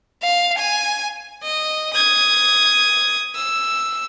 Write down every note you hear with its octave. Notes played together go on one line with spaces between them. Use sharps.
F5
G#5
D#5
D#6 G#6
E6